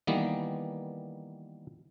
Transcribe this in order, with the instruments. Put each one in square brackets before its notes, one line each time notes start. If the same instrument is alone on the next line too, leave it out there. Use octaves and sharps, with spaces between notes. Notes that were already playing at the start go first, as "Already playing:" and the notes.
[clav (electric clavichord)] D#3 E3 G3 A#3 B3